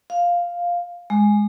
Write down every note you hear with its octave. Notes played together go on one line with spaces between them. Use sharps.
F5
G#3